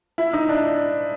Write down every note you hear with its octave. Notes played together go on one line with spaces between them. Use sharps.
E4
D#4
D4